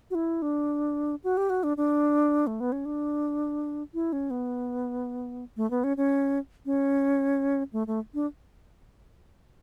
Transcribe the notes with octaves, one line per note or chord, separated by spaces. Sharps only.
F#4
E4
D4
F#4
G4
F#4
D4
D4
A3
B3
C#4
D4
E4
C#4
B3
A3
B3
C#4
C#4
C#4
A3
A3
D4